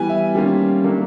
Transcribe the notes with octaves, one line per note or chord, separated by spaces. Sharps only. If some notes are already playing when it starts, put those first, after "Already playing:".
Already playing: E3 G3 B3 G#5
E5
D#3 G3 A#3 C#4 F4
D#3 F#3 A#3 D4